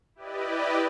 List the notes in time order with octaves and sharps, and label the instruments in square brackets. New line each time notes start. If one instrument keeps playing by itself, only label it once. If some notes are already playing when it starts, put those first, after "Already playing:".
[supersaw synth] E4 G4 B4 D5 D#5